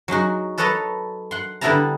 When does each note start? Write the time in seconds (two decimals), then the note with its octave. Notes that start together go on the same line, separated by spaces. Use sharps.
0.08 F#3 G#3 D#4 F#4
0.58 A4 B4 C#5 D#5 A5 A#5
1.31 F#5 C6
1.61 D3 G3 B3 E4 A5 A#5